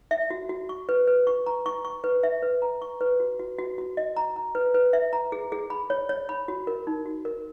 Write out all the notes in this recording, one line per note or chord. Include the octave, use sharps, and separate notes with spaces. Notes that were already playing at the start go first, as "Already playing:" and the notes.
E5
F#4
F#4
C#6
B4
B4
C#6
A#5
C#6
C#6
B4
E5
B4
A#5
C#6
B4
F#4
F#4
F#4
F#4
D#5
A#5
A#5
B4
B4
E5
A#5
G#4
G#4
B5
C#5
C#5
B5
F#4
A#4
D#4
F#4
A#4